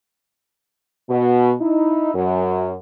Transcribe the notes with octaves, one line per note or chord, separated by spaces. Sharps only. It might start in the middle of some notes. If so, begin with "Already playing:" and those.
B2
D#4 E4
F#2